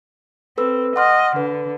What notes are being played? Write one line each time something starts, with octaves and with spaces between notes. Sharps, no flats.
C4 A4 B4 E6
D#5 F#5 C6 F6
D3 B4